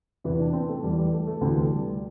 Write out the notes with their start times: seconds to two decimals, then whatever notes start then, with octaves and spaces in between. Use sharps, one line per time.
0.24 E2 C3 E3 E4
0.40 D4
0.53 C4
0.68 A3
0.83 E2 E3 G3
0.98 G3
1.12 A3
1.27 A3
1.41 D2 C3 E3 C4
1.56 A3
1.71 G3